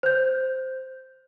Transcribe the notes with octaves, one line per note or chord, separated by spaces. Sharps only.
C5 G6